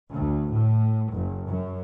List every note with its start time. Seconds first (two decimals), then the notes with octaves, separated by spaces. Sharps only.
0.11 D2
0.50 A2
1.12 F#1
1.46 F#2